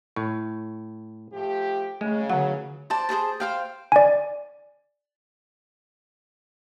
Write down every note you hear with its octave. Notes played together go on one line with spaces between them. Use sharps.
A2 C#6
F3 A3 G4
C#3 G#3 A3
D3 F#3 F#5
C5 D5 A5
G#4 A#4 C5 A5
C5 F5 G5
D5 G#5